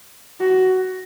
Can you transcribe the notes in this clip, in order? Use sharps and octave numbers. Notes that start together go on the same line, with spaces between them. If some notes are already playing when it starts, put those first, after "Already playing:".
F#4